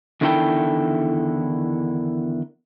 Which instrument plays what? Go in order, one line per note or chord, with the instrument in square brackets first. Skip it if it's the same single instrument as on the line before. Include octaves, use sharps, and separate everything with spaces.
[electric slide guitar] E2 D3 D#3 E4 A4 G5